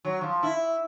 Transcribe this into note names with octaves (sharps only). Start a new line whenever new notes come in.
F#3
F3
E4